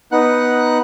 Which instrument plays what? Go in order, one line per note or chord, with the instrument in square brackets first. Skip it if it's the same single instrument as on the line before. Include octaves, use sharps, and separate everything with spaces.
[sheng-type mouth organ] B3 D#4 F#5 F#6